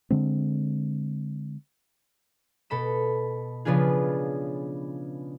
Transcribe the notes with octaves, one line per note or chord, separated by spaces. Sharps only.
D3 G#3 C4
B2 A4 B5 E7
C#3 F3 B3 D4 F4 G#4